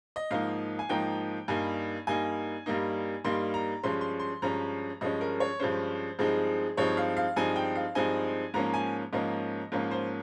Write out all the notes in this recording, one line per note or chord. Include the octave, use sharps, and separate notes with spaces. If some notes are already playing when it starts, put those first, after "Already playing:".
D#5
G#2 F3 A#3 D#4 F5
G#5
G#2 F3 A#3 D#4 G5
G2 G3 A#3 D#4 G#5
G2 G3 A#3 D#4 G#5
G2 G3 A#3 D#4
G2 G3 A#3 D#4 C6
A#5
G2 F3 G#3 C#4 C6
C6
C6
G2 F3 G#3 C#4 A#5
G2 F3 G#3 C#4 D#5
A#4
C#5
G2 F3 G#3 C#4 C5
G2 F3 G#3 C4 D#4 G#4
G2 F3 G#3 C4 D#4 C#5
F5
F5
G2 F3 G#3 C4 D#4 G#5
G5
F5
G2 F3 G#3 C4 D#4 G#5
G#2 F3 A#3 C#4 A#5
G#5
G#2 F3 A#3 C#4 D#5
G#2 F3 A#3 C#4
C5